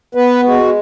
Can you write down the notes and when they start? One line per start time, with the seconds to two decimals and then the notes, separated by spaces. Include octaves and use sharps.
0.15 B3 B4
0.44 G#3 F#4